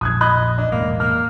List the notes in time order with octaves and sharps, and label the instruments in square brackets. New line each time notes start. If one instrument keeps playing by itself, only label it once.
[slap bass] A#1 F2 [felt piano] D#6 F#6 G#6
[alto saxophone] D#5 [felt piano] B5 D#6 F#6
[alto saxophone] D4 [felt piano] D#5
[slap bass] E1 A2 G#3 [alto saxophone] A#3
[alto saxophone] A#3 [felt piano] F6